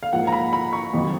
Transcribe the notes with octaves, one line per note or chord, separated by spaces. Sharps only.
F5
G#2 F3 A#3 F#5
A#5
B5
B5
C#6
F2 D#3 F#3